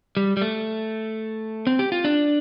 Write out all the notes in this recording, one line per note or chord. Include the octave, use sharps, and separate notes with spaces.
G3
G3
A3
C4
G4
F4
D4